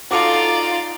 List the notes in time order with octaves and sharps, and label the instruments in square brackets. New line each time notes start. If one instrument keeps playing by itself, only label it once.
[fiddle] D#4 D5 [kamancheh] F4 [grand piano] F#4 A4 D6